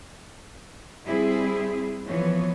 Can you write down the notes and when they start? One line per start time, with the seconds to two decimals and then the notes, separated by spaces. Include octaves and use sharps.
1.06 G3 C4 E4 G#4
2.07 E3 F3 B3 C#5